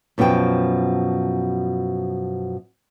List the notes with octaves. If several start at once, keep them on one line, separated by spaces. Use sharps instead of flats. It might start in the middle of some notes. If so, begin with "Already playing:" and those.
F#2 B2 F3 G#4 G5